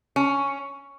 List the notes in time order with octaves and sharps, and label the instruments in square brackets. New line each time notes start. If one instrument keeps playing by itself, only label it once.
[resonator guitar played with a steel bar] C#4